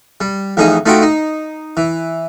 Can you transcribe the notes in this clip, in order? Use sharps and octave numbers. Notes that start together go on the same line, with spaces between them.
G3
A1 F2 C#4 D#4 G#4 G#5
A3 D#4 F4 F#4 F#5 G5
D#4
E3